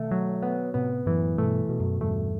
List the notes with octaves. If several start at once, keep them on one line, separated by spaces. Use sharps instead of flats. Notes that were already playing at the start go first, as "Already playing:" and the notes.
Already playing: B2 D#3 A3
F#3
B3
A2 C3 B3
F#2 A2 E3
G2 B2 A3
B2
F#2
E2 G2 A3